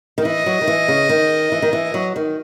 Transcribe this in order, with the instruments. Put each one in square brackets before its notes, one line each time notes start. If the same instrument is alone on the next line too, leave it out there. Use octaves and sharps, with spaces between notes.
[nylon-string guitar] D#3
[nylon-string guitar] E3 [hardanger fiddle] D#5
[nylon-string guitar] F#3
D#3
E3
C#3
D#3
E3
D#3
E3
F#3
D#3